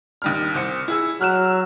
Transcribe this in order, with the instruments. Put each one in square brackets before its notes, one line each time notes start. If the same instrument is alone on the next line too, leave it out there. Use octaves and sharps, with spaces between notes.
[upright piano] D#2 G3 F6
C2 C5 C#7
E4 G#4 E6
[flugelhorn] F#3 [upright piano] F6 F#6 E7